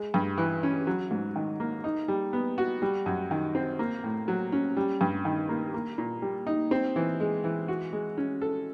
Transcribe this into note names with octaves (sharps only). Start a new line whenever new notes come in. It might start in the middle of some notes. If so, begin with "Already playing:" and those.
Already playing: G#3
G2
E3
C#4
F#3
G#2
D#3
A#3
D#4
G3
B3
F#4
G3
F#2
D#3
C4
A#3
A2
F#3
C#4
G3
G2
D#3
A#3
A#3
A#2
G3
D#4
C4
E3
G#3
E3
F#4
G#3
C#4
A4